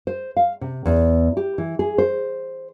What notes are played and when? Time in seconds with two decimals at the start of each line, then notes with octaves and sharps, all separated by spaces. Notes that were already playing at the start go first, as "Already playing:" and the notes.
0.07 C5
0.37 F5
0.61 C3
0.86 E2
1.37 G4
1.58 E3
1.79 G#4
1.98 C5